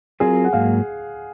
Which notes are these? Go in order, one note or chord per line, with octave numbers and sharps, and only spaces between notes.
F#3 C4 F4 G#4 A#4
F#5
G#2 F#3 A#3 F5